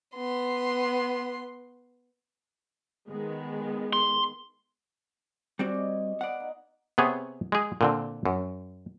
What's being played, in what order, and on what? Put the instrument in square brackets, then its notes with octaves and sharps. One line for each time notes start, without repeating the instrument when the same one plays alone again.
[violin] B3 C6
[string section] D#3 G#3 B3
[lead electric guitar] C6
[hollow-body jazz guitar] G3 C4 F#4 [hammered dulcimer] D5 G#5
[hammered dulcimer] D#5
[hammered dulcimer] B3 F5 [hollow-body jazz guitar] D5 F#5
[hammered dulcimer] D#4
[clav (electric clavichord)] C3 B3 G#4 C#5
G#3 G#4
A#2 D3 C4
F#2